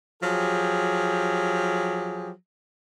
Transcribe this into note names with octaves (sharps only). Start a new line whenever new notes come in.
F3 F#3 G4 G#4